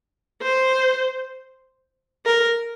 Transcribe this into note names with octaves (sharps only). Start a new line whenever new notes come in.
C5
A#4